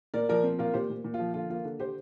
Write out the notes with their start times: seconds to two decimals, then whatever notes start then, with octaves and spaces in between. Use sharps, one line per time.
0.14 A#2 A#4 D5
0.29 F3 A#4 D5
0.44 C4
0.59 A#2 F4 A#4
0.74 A#2 G4 C5
0.90 A#2
1.04 A#2
1.14 F4
1.19 F3
1.34 D3 F4
1.50 A#3 F4
1.65 D3
1.79 D3 G4 C5